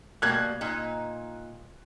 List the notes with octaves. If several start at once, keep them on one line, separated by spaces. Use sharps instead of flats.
B2 G3 A#3 F#6 G#6
A#2 D#4